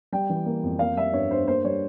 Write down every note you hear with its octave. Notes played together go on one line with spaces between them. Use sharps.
G3 G5
E3
A#3
F2
A#3 F5
G3 E5
G2 C#5
G2 C5
A#3 C5
G3 C#5